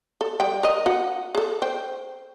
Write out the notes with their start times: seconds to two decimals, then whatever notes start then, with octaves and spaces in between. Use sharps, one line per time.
0.21 A4
0.40 G3 G5
0.63 A#4 D#5
0.86 F#4 F#5
1.35 G#4 A4
1.62 C5 G5